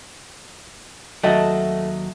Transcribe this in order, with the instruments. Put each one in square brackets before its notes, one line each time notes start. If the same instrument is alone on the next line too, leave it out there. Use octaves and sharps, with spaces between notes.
[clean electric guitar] D#2 F#3 [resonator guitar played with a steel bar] A3 [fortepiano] F#4 D#5 F#5